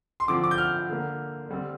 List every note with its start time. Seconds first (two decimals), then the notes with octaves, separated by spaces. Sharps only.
0.20 C6
0.28 D3 F3 C4 D6
0.44 D6
0.51 G6
0.58 F6
0.89 D3 A#3
1.49 D3 G3 C4